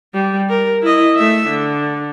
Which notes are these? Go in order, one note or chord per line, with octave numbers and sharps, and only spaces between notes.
G3
A#4
E4 D#5
A3 E5
D3